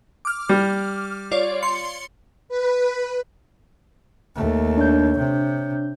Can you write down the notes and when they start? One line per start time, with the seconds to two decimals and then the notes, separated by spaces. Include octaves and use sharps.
0.25 D6 F6
0.49 G3
1.31 F4 C#5 D5
1.62 C6 C#7
2.49 B4
4.36 D#2 A3
4.77 D4 C#5 G6
5.18 C3